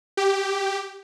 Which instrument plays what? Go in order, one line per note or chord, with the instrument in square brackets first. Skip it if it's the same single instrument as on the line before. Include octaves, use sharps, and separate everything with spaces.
[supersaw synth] G4